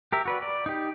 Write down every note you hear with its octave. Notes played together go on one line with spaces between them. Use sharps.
G4 A#4 E5
F#4 B4 D5
D5
D#4 G4